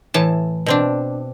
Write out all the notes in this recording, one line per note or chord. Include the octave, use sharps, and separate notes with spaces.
A2 E3 A5
B2 C4 D4